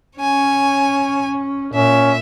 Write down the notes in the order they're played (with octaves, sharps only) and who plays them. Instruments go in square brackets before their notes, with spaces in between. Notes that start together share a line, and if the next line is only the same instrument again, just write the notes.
[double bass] C#4 [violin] C#5 G#5
[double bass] A#2 [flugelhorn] C#4 [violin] E5